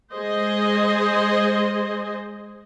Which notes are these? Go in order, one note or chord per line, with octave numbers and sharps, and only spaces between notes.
G#3 G#4 C5 D#5